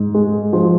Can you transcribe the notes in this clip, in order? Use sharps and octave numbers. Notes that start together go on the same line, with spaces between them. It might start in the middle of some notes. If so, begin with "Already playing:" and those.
Already playing: G#2
G#3
F3